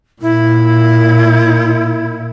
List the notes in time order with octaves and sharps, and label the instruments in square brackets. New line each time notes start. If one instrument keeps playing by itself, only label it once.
[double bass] A#2 [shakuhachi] E4